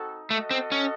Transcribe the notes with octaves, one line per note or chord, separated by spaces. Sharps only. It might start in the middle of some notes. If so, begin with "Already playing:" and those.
Already playing: C4 D#4 F#4 A4
A3 F#4 A4 D#5
C4
C#4